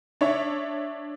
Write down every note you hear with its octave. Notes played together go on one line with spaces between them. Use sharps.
D4 C#5 E5